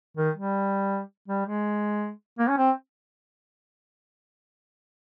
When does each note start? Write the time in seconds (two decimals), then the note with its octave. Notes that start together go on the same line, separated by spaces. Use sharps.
0.17 D#3
0.35 G3
1.28 G3
1.46 G#3
2.39 A#3
2.49 C#4
2.57 C4